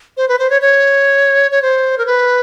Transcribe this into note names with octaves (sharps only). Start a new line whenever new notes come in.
C5
B4
C5
C#5
C#5
C#5
C5
A#4
B4